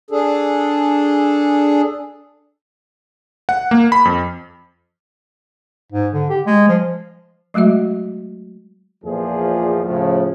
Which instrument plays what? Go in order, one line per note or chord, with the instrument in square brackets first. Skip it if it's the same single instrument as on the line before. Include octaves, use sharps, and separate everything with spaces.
[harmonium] D4 G#4 A4
[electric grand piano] F#5
A#3
B5
F2
[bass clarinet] G#2
D3
G4
G#3
F3
[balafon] F#3 G#3 A3 F#4 E5
[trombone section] E2 A#2 F3 G#4
A2 C#3 F3